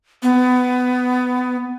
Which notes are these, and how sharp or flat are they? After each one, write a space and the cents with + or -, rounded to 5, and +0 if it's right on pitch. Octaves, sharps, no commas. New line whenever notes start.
B3 +20